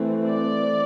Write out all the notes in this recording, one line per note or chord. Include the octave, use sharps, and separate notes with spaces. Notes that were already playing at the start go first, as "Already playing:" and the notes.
Already playing: E3 A3 C4
D5